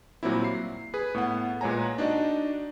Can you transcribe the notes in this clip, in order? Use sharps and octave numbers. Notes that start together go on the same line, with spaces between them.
A#2 F#3 G3 A#3 C4 E4
C7
G#4 B4
A2 B3 F#5
A#2 G#3 B4 C#5 G#5 A#5
D4 D#4 F#4 D5 D#5